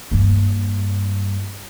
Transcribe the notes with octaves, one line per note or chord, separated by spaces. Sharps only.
G2 A#3